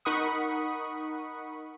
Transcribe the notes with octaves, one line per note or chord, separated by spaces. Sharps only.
D#4 A#4 F#5 B5 C#6 D#6